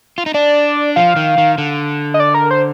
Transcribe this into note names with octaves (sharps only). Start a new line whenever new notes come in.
F4
D#4
D4 D5
F3 F5
D#3
D#3
D3
D#5
D5
A#4
C5